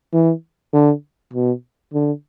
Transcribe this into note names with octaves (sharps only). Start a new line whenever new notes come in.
E3
D3
B2
D3